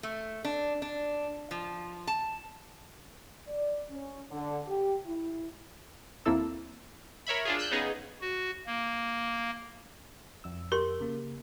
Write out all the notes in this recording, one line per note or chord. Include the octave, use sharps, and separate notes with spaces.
A3
D4
D4
F3
A5
D5
C#4
D3
G4
E4
D#2 A#3 C4 E4 A4 E6
A#4 C#5 E5 B5
D4 F4 G#4
E6 F#6 G6
C#3 B3 D#4 G#4
F#4
A#3
F2 E6
G4 A#4 C6
C#3 A#3